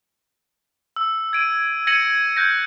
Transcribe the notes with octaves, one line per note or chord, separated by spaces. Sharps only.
E6
G#6 D7 D#7
G#6 A#6 C#7 D#7 F#7
F#6 G6 A#6